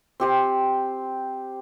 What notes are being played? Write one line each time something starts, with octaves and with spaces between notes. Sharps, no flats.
C4 G4 C5